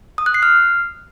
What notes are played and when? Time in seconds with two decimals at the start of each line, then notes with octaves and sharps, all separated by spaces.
0.18 D#6
0.26 F#6
0.34 C7
0.43 F6